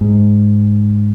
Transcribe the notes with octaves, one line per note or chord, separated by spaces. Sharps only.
G#2